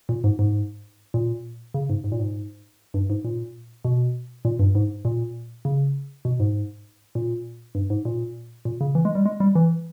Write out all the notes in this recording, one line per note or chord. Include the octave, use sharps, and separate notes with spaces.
A#2
G#2
G#2
A#2
C#3
G#2
G#2
A#2
G#2
G2
G#2
A#2
B2
A#2
G2
G#2
A#2
C#3
B2
G#2
A#2
G2
G#2
A#2
A#2
C#3
E3
G#3
G3
G#3
G3
E3